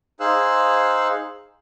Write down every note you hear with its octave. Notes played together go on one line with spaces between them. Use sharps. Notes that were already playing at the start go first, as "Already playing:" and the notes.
D#4 G#4 C5 F5 E6 F#6